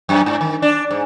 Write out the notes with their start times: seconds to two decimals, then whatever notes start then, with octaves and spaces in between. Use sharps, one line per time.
0.09 F#2
0.26 G#2
0.41 D#3
0.62 D4
0.91 G#2